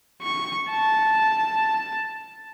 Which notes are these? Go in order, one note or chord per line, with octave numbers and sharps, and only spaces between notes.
C#6
A5